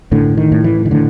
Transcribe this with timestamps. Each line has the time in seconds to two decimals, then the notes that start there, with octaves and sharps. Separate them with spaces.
0.12 A2 D3
0.37 D#3
0.52 A2
0.64 E3
0.86 D#3
0.91 A2 D3